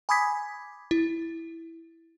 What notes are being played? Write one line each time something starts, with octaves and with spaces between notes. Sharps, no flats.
G#5 B5 D6 D#6 G#6 B6
E4